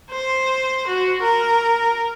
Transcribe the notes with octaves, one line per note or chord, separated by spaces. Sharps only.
C5
F#4
A#4